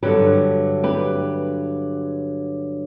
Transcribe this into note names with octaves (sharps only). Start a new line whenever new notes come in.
G2 D3 F#3 G4 B4
G4 B4